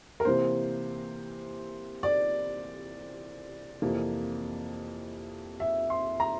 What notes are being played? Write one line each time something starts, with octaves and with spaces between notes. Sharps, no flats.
A#4
C3 E3 A#3 C5
D5
F2 C3 E3 A#3
E5
C6
A#5